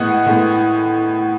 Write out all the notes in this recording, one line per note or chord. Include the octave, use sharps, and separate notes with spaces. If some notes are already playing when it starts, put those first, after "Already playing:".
Already playing: A2 G#3 B3 D#5 F#5
A2 G#3 B3